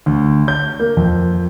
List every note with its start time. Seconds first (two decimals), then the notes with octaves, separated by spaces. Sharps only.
0.06 D2
0.48 G6
0.80 A#3
0.97 F2